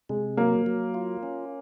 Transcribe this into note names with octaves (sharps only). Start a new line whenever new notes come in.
C3 G#3
F#3 A#3
F#3
F4
C#4